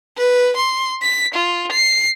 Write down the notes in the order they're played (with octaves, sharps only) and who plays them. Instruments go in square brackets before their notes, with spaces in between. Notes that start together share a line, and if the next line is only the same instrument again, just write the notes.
[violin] B4
C6
B6
F4
C7